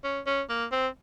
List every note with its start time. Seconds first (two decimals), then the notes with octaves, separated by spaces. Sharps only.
0.04 C#4
0.26 C#4
0.50 A#3
0.72 C4